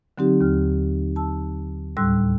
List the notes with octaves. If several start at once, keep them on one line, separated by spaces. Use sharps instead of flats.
D3 F#3 C4 D#4 G4
D#2 F6
A5 E6
D2 A2 G3 C6 E6 F#6